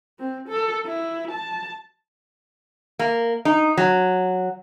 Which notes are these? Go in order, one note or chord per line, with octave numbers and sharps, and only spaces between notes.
C4
A4
E4
A5
A#3
D#4
F#3